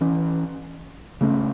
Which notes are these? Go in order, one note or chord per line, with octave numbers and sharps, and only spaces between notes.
E3 C#4
C#3 A3 C#4